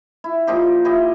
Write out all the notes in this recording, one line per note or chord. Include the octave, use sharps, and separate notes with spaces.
E4
A#2 F3 D#4 G4
E4 F4 G4 D#5